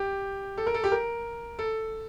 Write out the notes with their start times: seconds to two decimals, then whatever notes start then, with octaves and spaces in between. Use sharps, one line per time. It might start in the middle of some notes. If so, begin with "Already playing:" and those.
Already playing: G4
0.58 A4
0.67 A#4
0.74 A4
0.84 G4
0.92 A#4
1.59 A4